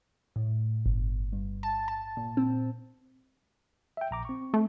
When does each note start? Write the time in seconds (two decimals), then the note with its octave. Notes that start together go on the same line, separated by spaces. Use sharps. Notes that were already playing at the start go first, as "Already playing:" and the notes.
0.36 A2
0.86 G1
1.32 G2
1.63 A5
1.88 A5
2.17 A#2
2.37 C4
3.97 E5 G5
4.11 A#1 A#5 D6
4.25 C4 C#6
4.54 A3